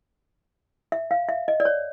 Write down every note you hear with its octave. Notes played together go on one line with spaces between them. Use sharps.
E5
F5
E5
D#5
D5
C#5